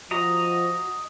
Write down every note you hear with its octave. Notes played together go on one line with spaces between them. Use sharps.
F3 F#4 D#5 A#5